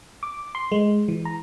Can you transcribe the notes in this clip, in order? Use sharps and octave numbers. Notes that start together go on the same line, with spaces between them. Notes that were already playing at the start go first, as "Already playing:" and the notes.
D6
C6
G#3
E3
A#5